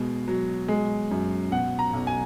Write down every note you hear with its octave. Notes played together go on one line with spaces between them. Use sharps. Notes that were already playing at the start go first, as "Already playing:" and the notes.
Already playing: B2 G#3
F#3
G#3
F#2
B2 F#5
A#5
B1
G#5